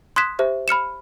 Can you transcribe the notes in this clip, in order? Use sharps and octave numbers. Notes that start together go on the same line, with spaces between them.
C6 D#6 F#6 G#6 B6 E7
G4 C5 E5
B5 F6 C#7 E7